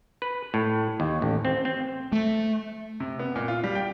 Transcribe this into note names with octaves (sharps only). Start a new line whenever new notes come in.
B4
A2
D#2
A1
C4
C4
A3
C3
B3
A#2
F4
G3
G5